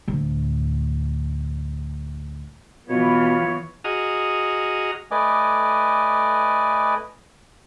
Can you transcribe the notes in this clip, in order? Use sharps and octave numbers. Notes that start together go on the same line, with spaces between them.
D2 A2
B2 E3 B3 F4 C#5
F#4 G#4 D#5 A#5 D#6 F6
A3 B4 D5 D#5 G#5 D6